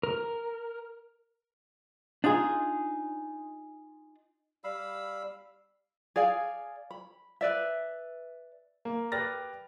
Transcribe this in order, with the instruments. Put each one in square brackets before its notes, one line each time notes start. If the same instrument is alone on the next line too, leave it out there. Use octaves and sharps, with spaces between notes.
[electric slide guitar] A#4
[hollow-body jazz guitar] D4 D#4 F4 G#4
[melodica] G3 F5 B5 E6
[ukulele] G#4 D5 F5 G#5
B5
B4 D5 E5
[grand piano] A#3
G4 B4 D5 F6 A6 A#6